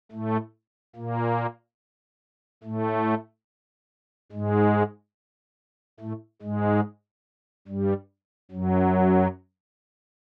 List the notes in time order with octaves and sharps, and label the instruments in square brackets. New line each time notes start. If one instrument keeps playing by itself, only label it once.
[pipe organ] A2 A3
A#2 A#3
A2 A3
G#2 G#3
A2 A3
G#2 G#3
G2 G3
F#2 F#3